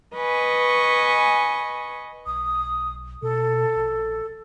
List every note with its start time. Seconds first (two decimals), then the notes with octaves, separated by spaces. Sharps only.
0.16 B4 D#5 G#5 C#6
2.26 B1 D#6
3.22 B2 A4
3.76 A#1